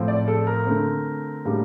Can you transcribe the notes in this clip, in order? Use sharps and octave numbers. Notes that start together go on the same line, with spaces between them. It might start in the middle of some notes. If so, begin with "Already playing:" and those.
Already playing: A2 F3 C4
D5
A4
A#4
D3 A3 C4
A2 G3 A#3 D4